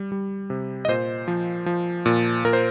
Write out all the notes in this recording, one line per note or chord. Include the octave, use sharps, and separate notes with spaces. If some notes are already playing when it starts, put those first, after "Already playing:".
Already playing: G3
G3
C3
D#5
A#2 C5
F3
F3
A#2
A#2 A#4
C5